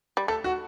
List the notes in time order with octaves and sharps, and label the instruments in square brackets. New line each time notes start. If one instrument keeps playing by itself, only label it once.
[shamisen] G3
[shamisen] A3 [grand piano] A4
[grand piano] F#4